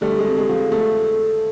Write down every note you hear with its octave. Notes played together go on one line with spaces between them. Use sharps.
D3 G3 A3
G#3
F2
G#3
F3
A3